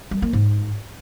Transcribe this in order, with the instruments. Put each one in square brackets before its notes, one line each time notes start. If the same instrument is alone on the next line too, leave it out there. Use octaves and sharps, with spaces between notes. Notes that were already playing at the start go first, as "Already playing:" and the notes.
[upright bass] G3
A#3
G#2